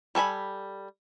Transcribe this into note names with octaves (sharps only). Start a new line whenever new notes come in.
G3 A4 G#5 B5